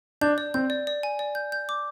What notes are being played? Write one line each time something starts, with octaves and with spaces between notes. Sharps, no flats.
D4 G6
D5
C4 G6
D5
D5
G#5
D5
G6
G6
D6